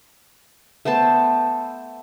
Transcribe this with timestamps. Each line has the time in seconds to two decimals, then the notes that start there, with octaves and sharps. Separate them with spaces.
0.85 A3 B3 C5 A5